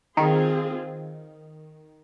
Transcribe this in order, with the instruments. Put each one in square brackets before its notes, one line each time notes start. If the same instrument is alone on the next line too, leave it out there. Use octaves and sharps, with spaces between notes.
[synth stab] D#3 [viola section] C4 F4 G#4